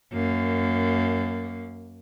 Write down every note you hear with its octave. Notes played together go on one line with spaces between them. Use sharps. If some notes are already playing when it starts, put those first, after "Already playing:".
F#2 A#3